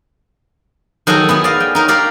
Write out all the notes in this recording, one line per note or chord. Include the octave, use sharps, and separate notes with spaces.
D#3 F#3 F#4 G#4 A4 C#5
B3 E4 G#4
D5 D#5 F5
G5
D#4 A#4 C#5
G4 A#4 D5 F5